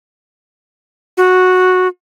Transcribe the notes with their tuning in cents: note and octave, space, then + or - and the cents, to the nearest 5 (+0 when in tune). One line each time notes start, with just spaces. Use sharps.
F#4 -10